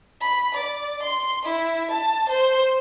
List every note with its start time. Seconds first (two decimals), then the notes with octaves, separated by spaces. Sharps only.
0.21 B5
0.54 D5
1.02 C6
1.45 E4
1.91 A5
2.29 C5